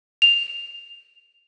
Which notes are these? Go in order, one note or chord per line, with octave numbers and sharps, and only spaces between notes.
F7